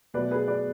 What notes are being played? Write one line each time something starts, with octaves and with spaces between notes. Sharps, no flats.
B2 F#3 A3 B4 D5
G#4 B4
B4 D5